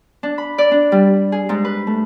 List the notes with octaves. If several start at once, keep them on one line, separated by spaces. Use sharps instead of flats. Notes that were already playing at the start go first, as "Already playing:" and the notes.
D4
B5
D5
D4
G3
G#4
G#2
B4
A3